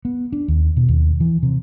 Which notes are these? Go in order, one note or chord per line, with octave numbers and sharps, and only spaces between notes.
B3
D4
D#2
B2
D#2
E3
C3